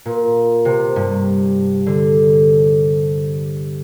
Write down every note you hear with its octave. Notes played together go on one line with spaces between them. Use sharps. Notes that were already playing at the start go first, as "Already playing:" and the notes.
A#2
C3
G2
D3